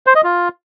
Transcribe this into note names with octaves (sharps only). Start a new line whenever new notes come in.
C5
D#5
F4